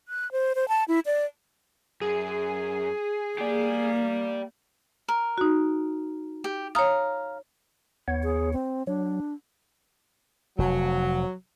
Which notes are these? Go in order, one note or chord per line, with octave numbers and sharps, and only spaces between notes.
F#6
C5
C5
A5
E4
D5
F#2 G#4
A#3 G4 D5
A#4
D#4 F#4
G4
C#5 F5 A#5 D#6
D#2 B3 C#5
G#4
C4
F#3 D4
F1 F#3